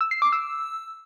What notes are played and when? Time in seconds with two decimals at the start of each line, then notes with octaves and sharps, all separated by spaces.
0.01 E6
0.11 C7
0.22 D6
0.33 E6